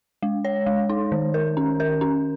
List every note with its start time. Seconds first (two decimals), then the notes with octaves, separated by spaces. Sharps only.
0.23 G#3
0.45 C#5
0.66 G#3
0.89 D#4
1.12 D#3
1.34 A#4
1.57 C#4
1.80 A#4
2.01 C#4